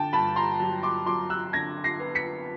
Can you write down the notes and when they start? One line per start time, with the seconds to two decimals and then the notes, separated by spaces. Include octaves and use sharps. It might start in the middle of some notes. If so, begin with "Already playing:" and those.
Already playing: D3 G5 A5
0.13 G2 A5 B5
0.36 A#5 C6
0.60 F#3
0.83 C6 D6
1.06 F#3 C6 D6
1.30 E6 F#6
1.53 D3 G#6 A#6
1.84 A#6 C7
2.00 B3
2.15 B6 C#7